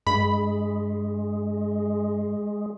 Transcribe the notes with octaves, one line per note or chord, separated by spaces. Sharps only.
G2 G#3 B5